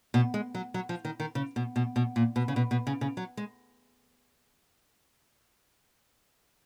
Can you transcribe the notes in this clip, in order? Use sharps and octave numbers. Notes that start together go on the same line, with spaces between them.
B2
G#3
F#3
F#3
F3
D#3
D#3
C#3
B2
B2
B2
A#2
B2
C#3
B2
B2
C#3
C#3
F#3
G#3